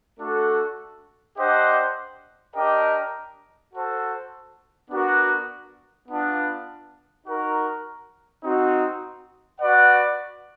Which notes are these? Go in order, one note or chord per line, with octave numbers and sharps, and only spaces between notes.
A3 D4 F#4 A4
D4 G4 C5 D#5 F#5
D4 G4 A#4 D#5 G5
F#4 A4 C5
B3 D4 F#4 A#4
B3 D4 F4
D#4 F#4 A#4
C4 D#4 F#4
F#4 B4 D5 F#5